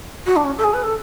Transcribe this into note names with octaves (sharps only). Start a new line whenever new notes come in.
F#4
D4
C#4
A4
G#4
B4
A4